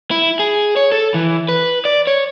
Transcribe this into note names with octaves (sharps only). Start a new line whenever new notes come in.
E4
G#4
C#5
A4
E3
B4
D5
C#5